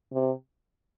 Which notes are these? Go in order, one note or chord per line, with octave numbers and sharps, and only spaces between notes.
C3